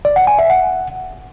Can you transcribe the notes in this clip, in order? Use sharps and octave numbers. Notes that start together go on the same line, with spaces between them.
D5
F#5
G#5
E5
F#5